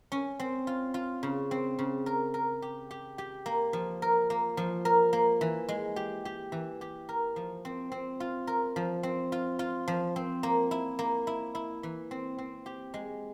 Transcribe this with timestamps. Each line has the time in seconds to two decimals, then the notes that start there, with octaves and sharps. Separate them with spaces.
0.12 C#4
0.40 C4
0.67 F4
0.94 F4
1.23 C#3
1.51 C4
1.79 C#3
2.06 A#4
2.34 A#4
2.62 G4
2.91 G4
3.18 G4
3.46 A#3
3.73 F3
4.02 A#4
4.30 A#3
4.57 F3
4.85 A#4
5.13 A#3
5.41 E3
5.69 G#3
5.96 G4
6.25 G4
6.52 E3
6.81 G4
7.09 A#4
7.36 F3
7.65 C4
7.92 C4
8.20 F4
8.47 A#4
8.76 F3
9.03 C4
9.32 F4
9.59 F4
9.88 F3
10.16 C4
10.43 A#3
10.71 E4
10.99 A#3
11.27 E4
11.55 E4
11.83 E3
12.11 C4
12.38 C4
12.66 G4
12.94 G#3